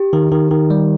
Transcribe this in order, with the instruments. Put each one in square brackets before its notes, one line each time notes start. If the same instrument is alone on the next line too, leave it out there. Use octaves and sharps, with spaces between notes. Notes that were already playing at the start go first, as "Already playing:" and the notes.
Already playing: [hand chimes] G4
[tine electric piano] D#3
D#3
D#3
G3